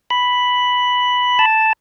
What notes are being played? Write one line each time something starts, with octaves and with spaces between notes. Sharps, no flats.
B5
A5